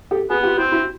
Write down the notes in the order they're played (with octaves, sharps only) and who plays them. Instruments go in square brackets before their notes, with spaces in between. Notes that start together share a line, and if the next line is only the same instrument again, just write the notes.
[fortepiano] G4 A4
[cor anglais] B3 [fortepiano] F#4 G#4
[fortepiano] F4 G4
[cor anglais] C4 [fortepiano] E4 F#4
[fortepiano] E4 F#4